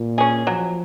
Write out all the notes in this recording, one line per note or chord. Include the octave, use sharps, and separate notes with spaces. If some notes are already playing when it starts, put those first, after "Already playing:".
Already playing: A#2
C#4 G#4
F3 F#3